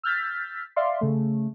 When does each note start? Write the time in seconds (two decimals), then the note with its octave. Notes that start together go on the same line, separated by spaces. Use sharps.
0.03 E6 F6 G6 A6 B6
0.76 D5 E5 F5 C6
1.01 C#3 A3